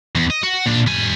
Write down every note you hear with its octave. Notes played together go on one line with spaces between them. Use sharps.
E2
D#5
F#4
A#2 D4
G3 G#5